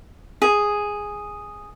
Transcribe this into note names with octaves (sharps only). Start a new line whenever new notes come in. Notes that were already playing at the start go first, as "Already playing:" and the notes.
G#4